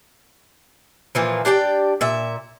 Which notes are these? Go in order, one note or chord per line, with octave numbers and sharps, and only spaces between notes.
A#2 E3 F3
D4 G4 D5 G5
A#2 E5